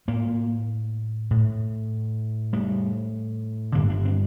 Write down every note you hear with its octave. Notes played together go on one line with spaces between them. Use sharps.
A2 A#3
A2
A2 G3
G2 D3 A#3
D4
C4